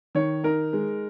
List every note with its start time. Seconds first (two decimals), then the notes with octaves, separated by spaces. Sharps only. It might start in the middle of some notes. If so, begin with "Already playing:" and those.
0.15 D#3 C#5
0.44 D#4 A#4
0.73 G#3